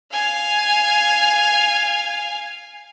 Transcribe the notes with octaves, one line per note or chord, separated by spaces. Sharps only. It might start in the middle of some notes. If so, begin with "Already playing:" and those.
F5 G#5